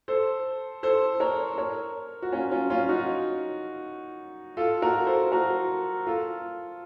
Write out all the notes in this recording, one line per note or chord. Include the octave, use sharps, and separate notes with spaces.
A4 C5
A4 C5
A#4 C#5
A#4 C#5
F#4
C#4 F4
C#4 F4
C#4 F4
D#4 F#4
F4 A4
F#4 A#4
A4 C5
F#4 A#4
F4 A4